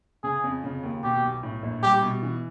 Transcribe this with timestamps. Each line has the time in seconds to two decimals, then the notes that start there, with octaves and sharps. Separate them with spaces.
0.24 C#3 G#4
0.44 F2
0.64 C#3
0.83 D#2
1.03 B2 G4
1.23 B1
1.43 A2
1.63 A#1
1.83 G3 G4
2.03 B2
2.23 E3